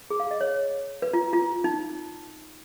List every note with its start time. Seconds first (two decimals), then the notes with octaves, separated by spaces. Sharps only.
0.10 G#4
0.20 F5
0.31 D#5
0.41 C#5
1.02 B4
1.13 F4
1.33 F4
1.64 D#4